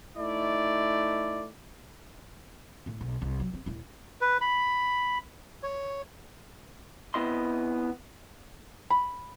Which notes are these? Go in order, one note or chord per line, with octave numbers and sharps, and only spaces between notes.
A3 D#4 E4 D5
A2 A3
B1
C2
F#3
C4
D#1 E4
B4
B5
C#5
B3 C4 E4 D#5 C6
B5